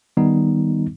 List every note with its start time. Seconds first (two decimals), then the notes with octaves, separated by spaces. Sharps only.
0.17 D#3 G3 B3 D#4